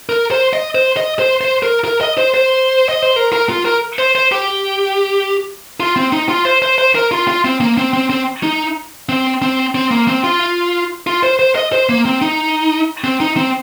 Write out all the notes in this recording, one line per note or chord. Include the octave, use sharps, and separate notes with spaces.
A#4
C5
D#5
C5
D#5
C5
C5
A#4
A#4
D#5
C5
C5
D#5
C5
A#4
A#4
F4
A#4
C5
C5
G4
F4
C4
D#4
F4
C5
C5
C5
A#4
F4
F4
C4
A#3
C4
C4
C4
D#4
C4
C4
C4
A#3
C4
F4
F4
C5
C5
D#5
C5
A#3
C4
D#4
C4
D#4
C4